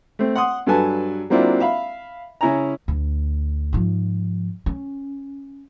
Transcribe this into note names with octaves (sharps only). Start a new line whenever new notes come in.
A3 C4
F#5 C6 D#6
G2 F#3 A4 B4 G#5 A5
F#3 A#3 C4 D4 E4 F4
E5 F5 B5
C#3 C#4 E4 G#5 A#5
D2
G#2 F3
C#4